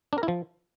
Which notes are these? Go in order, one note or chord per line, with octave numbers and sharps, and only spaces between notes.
D4
A#4
E4
F3